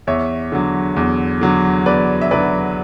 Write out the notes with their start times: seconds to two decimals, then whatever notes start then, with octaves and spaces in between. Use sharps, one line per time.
0.07 E2 C#5 E5
0.52 D3 F#3
0.96 E2
1.41 D3 F#3
1.86 E2 B4 D5
2.22 E5
2.31 D3 F#3 B4 D5